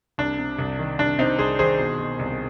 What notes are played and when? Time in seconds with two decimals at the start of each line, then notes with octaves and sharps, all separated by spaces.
0.18 C2 D4
0.39 C3
0.59 C2
0.79 D#3
0.99 C2 D4
1.19 C3 C4 D#4
1.39 C2 G#4 C5
1.59 D#3 G#4 C5
1.79 B2
1.99 B2
2.19 C2